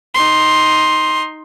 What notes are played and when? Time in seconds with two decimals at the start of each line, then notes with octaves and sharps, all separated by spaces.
0.15 D#4 C6